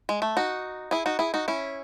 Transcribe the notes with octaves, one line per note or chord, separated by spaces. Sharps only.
G#3
A3
D#4 F#4
E4 G#4
D#4 F#4
E4 G#4
D#4 F#4
C#4 E4